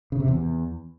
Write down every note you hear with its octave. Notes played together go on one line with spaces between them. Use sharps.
C#3
C3
E2